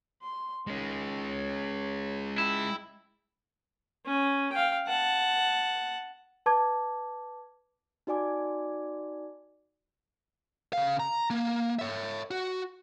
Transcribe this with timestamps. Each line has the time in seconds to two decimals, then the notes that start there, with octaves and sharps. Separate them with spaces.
0.22 C6
0.67 D#3 G#3 C#4
1.30 C#5
2.38 E4 G5
4.06 C#4
4.52 F5 G5
4.87 F#5 A5
6.46 B4 A5 D6 G#6
8.07 D#4 F#4 D5 G#5 D6
10.73 C#3 F5
11.00 A#5
11.30 A#3
11.79 C#5 E5
12.31 F#4